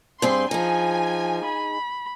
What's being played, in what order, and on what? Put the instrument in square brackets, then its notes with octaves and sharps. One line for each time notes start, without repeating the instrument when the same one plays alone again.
[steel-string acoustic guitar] G2 C4 G#4 [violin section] C6
[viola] F3 [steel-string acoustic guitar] D#4 G#4 [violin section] G#5
[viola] B5